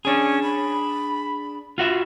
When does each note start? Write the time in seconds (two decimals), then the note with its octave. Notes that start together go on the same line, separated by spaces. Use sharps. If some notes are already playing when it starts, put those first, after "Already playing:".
0.05 C#4 D4 G#4
0.43 B5
1.78 F4 F#4 E5